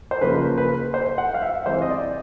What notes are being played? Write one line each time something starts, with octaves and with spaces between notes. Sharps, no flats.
C5
C#3 F3 A#3 B4
B4
C5
F#5
F5
E5
C3 E3 G#3 C5
D#5
D5